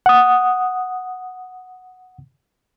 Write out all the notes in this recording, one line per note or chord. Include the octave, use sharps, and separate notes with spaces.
F#5 D#6